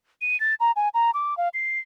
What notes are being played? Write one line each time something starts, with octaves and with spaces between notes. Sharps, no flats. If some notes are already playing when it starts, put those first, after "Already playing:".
D#7
A6
A#5
G#5
A#5
D6
F5
C7